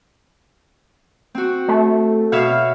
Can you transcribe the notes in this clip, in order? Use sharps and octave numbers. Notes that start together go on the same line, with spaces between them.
C4 F#4
A3
B2 C#5 E5 F5